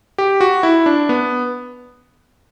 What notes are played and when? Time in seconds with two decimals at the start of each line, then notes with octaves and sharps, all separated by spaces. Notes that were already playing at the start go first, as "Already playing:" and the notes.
0.18 G4
0.41 F#4
0.63 E4
0.86 D4
1.09 B3